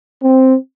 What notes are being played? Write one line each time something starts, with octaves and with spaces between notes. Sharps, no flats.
C4